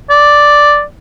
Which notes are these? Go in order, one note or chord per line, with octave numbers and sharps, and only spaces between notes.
D5